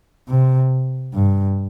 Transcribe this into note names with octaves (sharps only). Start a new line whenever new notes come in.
C3
G2